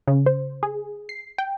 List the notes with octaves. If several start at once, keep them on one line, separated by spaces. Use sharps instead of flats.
C#3
C5
G#4
C7
G5